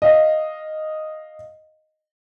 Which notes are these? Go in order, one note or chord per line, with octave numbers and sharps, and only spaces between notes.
D#5 F5